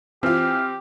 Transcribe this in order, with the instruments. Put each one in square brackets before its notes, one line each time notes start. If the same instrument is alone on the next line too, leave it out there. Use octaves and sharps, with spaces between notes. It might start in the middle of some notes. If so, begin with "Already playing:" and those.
[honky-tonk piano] E3 F4 [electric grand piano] C4 [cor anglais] G4 [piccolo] F6